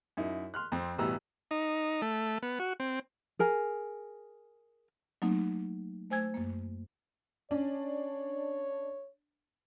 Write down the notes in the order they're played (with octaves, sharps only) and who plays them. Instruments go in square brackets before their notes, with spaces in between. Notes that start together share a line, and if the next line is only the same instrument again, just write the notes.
[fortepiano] F#2 D#4 E4
C6 F6 F#6
F2 C4
A1 B2 E3 G3 A#5 E6
[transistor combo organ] D#4
A3
B3
F#4
C4
[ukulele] G#4 A#4 G#5
[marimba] F#3 A3 A#3 C4 D#4
A3 C5 G#5 E6 G#6
F#2 A#3
[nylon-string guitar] C#4 [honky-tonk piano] D4 [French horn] C#5